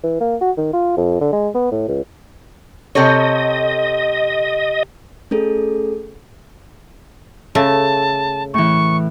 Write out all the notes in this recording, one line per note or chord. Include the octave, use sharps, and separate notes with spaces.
E3
A#3
F#4
D#3
F4
F2
D3
G#3
B3
A2
C#2
C3 A4 C#5 D#5
A3 C#4 G#4 A4
C#3 A3 A5
A2 E3 C#6